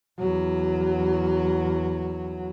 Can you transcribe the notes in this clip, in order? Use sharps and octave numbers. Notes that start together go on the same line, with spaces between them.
E2 F#3